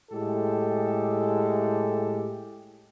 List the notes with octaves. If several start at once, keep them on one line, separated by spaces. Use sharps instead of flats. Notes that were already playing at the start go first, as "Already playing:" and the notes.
A2 G#3 G4 A4